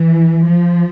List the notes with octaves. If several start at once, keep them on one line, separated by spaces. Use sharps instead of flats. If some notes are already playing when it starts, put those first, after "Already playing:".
Already playing: E3
F3